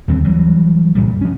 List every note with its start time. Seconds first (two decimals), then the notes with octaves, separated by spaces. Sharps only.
0.08 D#2 D3 G3 C4
0.24 E3 F#3 G3
0.95 C2 G2 A#2 G3
1.21 F3 C#4